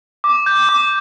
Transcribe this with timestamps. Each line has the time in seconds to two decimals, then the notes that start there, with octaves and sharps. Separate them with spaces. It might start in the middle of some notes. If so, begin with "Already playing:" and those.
0.24 D6
0.46 G6
0.69 D6